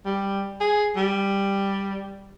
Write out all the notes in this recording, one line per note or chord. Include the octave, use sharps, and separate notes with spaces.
G3
G#4
G3